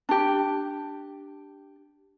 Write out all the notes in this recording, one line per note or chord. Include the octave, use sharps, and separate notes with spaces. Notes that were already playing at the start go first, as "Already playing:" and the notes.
D4 G4